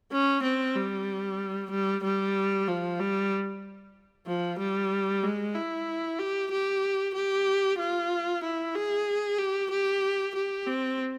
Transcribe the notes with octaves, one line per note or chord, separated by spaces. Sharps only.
C#4
C4
G3
G3
G3
F3
G3
F3
G3
G#3
E4
G4
G4
G4
F4
E4
G#4
G4
G4
G4
C4